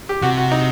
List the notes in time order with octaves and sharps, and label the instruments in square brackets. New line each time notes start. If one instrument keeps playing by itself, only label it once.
[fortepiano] G4
[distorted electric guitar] C3 [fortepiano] F#4
[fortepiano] F#4
D#4